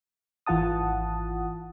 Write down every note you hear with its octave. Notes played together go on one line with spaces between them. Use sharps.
G#1 E3 F4 F#5 A5 D#6